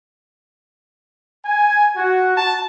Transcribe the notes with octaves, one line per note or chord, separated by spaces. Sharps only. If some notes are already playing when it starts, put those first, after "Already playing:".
G#5
F#4
A5